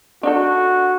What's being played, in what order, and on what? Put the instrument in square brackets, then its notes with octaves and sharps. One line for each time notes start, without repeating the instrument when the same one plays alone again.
[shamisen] D4 D#4 A4 [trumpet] F#4